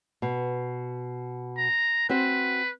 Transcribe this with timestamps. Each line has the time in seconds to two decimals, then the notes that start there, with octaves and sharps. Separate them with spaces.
0.22 B2
1.58 A#5
2.09 C4 F#4 B4 C5